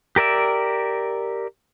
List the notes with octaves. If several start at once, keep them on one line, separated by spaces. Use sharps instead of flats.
G4 A#4 D5 E5